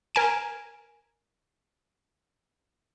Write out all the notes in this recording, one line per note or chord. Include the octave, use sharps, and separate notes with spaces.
A#4 G#5 D7